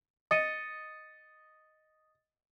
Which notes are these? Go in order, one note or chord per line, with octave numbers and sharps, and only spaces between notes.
D#5 A6 C#7 D#7